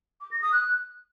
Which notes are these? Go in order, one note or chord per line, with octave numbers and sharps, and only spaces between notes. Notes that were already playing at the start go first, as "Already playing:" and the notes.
D6
A#6
D#6
F#6